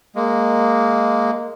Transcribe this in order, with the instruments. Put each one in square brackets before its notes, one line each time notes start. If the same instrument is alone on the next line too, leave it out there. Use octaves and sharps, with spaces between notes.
[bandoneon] G#3 A#3